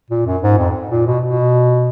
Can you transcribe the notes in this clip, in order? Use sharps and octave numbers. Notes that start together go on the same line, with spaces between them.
A#2
F#2
G#2
F2
A#2
B2
B2